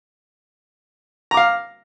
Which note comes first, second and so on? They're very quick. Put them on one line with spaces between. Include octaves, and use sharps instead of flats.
A#5 D6 F5